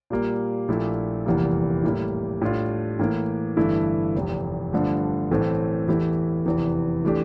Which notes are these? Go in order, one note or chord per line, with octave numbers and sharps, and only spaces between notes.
A#2 G3 A#3
A#1 A#2 A3 E4 G4
F1 E2 E3 G3 A#3
A2 G3 A#3 E4
A2 G3 D4 F4
A2 E3 A#3
G1 G2 E3 A3 E4
F1 E2 C3
G2 D3 F3 A3
A1 A2 E3 A3 C4
E2 E3 A3 E4 G4
F1 E2 C3 E3
E3 A3 D4 G4